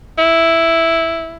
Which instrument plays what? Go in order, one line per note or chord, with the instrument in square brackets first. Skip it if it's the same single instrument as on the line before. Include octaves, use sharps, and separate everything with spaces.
[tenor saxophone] E4